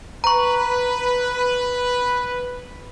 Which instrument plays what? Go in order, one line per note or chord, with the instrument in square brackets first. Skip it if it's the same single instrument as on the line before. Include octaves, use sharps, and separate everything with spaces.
[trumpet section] B4 [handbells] A#5 C#6